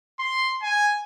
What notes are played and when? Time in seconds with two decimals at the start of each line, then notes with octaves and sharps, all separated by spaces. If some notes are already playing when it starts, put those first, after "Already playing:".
0.19 C6
0.62 G#5